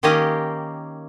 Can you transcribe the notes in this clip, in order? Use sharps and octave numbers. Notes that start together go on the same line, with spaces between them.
D#3 A#3 C#4 G4 D#5 F5